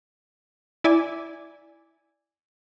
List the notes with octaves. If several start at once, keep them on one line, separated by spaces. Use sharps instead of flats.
E4 D5 E5 G#5